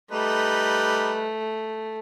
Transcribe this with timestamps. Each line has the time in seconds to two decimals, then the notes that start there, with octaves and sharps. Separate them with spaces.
0.11 G3 A3 D#4 B4